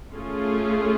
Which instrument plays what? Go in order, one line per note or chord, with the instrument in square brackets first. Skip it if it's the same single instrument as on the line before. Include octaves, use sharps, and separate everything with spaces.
[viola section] A3 C#4 F4 G#4